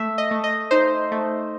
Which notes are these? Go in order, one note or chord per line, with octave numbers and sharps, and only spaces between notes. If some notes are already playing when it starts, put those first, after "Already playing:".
Already playing: A3 E5
D#5
A3
D#5
D#4 C5
A3